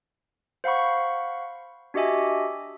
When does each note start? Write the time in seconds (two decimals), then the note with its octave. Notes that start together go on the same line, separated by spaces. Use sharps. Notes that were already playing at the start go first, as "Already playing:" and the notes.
0.64 C5 F5 F#5 B5 C#6
1.94 D4 F#4 G4 D#5 E5 G#5